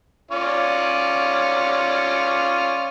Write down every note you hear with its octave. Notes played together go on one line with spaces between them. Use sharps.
C#4 F4 D5